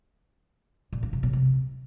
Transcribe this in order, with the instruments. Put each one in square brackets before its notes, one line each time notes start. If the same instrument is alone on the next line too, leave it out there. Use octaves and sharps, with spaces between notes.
[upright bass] A#2
D4
B2
B2
C3